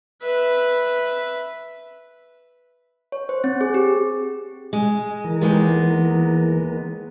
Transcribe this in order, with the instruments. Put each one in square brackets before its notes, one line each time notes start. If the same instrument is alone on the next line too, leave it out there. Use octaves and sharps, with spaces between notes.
[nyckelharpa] B4 E5
[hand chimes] C#5
C5
C4
G#4
G4
[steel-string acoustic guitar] G#3
[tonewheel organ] E3 A#4
[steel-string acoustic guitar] D#2 G#3 B3